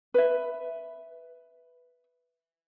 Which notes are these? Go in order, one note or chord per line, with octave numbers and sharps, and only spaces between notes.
B4 E5